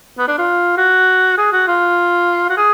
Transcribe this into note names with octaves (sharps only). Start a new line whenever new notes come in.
B3
D4
F4
F#4
G#4
F#4
F4
F#4
G#4